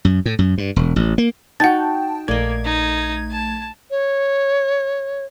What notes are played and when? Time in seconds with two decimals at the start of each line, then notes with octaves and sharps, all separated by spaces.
0.05 F#2
0.26 A2
0.39 F#2
0.58 G2
0.76 E1
0.96 A1
1.18 A#3
1.60 D#4 F#4 F#5 G5 A5 A6
2.28 A#1 A3 A#3 D5 D#5 G#6
2.65 D#4
3.31 A5
3.91 C#5